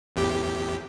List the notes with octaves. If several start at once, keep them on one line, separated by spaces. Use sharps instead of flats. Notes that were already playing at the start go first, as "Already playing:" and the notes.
A1 E2 G4